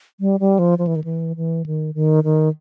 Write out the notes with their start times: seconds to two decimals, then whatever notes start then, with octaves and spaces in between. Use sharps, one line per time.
0.20 G3
0.40 G3
0.59 F3
0.78 F3
0.87 E3
0.96 D#3
1.04 E3
1.36 E3
1.66 D#3
1.95 D#3
2.24 D#3